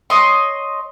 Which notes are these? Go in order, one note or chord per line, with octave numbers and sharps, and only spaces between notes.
C#5 D#5 C6